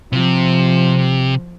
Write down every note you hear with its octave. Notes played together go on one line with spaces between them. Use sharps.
C3 F3